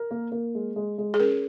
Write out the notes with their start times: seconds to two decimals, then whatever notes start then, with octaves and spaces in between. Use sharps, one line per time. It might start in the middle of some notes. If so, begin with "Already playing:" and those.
Already playing: A#4
0.11 A#3
0.32 A#3
0.55 G#3
0.76 G#3
0.98 G#3
1.14 G#4
1.20 C#4 A#4